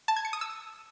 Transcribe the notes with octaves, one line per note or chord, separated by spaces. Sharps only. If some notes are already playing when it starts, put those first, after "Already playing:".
A5
G#6
C#7
D#6
E6